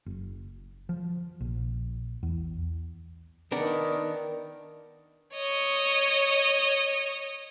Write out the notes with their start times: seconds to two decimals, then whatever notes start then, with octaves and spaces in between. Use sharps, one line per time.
0.06 F#1
0.89 F3
1.41 A#1
2.23 E2
3.52 D#3 B3 D4 A#4
5.35 C#5 D#5